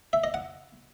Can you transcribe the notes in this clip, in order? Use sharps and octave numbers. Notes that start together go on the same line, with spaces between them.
E5
D#5
F#5